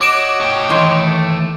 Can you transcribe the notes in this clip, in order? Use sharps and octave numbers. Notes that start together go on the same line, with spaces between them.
F#4 C#5 D#5 D6 D7 E7
A3 G5
D#2 E3 C6